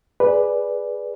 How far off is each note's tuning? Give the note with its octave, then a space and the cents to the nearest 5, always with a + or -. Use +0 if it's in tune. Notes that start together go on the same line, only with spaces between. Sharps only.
G#4 +0 B4 +0 D5 +0